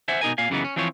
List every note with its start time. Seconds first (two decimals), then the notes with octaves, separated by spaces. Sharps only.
0.08 C5 E5 F#5 G#5
0.21 B2 D#4 A#4 G#5
0.38 A#2 F5 G#5
0.50 F#2 C#3 E3 B3 D#4
0.64 C#4
0.76 E3 F3 C4 F4 C5 C#5